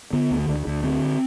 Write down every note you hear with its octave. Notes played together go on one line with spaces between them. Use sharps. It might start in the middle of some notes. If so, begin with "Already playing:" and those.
D3 B3
D2
D2
D2
D3 C4